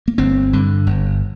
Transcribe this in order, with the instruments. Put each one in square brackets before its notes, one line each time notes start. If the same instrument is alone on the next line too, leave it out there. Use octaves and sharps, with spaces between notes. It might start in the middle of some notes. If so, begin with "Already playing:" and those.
[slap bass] A#3
G1 C4
G2 D3
G1